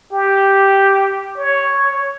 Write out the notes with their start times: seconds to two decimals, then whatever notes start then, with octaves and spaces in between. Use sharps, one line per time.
0.12 G4
1.37 C#5